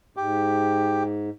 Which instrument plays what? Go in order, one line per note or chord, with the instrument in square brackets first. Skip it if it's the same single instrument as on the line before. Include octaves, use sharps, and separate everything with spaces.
[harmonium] G#2 [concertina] G4